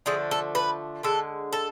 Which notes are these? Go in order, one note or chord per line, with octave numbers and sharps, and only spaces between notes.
D3 F3 A3 G#4
A4
B4
D3 G#3 A4
A4